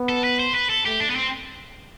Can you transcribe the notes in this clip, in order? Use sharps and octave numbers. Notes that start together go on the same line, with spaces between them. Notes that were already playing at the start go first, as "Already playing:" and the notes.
Already playing: B3
A4
B4
C5
B4
A4
A3 G4
D4
B3
C4